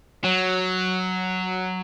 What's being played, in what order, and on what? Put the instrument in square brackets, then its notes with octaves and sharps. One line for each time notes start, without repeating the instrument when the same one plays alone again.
[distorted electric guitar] F#3